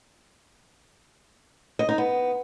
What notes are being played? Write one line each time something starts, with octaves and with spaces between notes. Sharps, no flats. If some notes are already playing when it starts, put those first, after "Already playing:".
D#5
D#4
B3